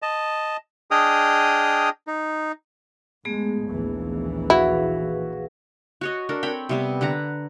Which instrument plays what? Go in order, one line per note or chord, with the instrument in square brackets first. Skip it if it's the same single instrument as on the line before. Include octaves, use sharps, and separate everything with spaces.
[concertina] D#5 A5
D4 G#4 D#5 G5 D#6 F6
D#4
[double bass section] G#2 G#3 [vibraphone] A3 B3 G#4
[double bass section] A#1 D#2 E3
[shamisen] E4 [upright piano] F#4 [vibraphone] G#4 B4 F5
[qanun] F#4 C#5 D#5
D4 A4 A#4
C4 C#5 G5 B5
C3 G3 B3
D3 B4 F#5 A#5